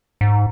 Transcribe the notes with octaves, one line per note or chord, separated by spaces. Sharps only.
G#2